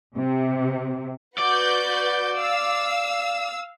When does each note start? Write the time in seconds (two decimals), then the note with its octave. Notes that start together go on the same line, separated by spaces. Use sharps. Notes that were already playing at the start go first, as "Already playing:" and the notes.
0.16 C3
1.38 F#4 B4 D5 G6
2.37 F5 E6